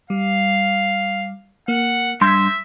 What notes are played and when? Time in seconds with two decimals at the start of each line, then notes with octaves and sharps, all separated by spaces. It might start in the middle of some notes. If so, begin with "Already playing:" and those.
0.10 G3 F5
1.68 A#3 F#5
2.21 G2 E5 C6 G6 G#6 A#6